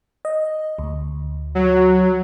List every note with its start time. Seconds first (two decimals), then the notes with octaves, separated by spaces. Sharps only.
0.25 D#5
0.79 D2
1.55 F#3